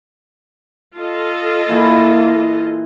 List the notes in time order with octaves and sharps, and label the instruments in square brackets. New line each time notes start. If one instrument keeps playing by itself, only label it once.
[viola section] F4 A4 D#5
[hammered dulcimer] A#2 E3 [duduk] A#3